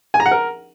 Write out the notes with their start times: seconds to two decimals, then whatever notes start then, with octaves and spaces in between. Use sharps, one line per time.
0.14 G#5
0.20 A#5
0.26 F#5
0.31 A#4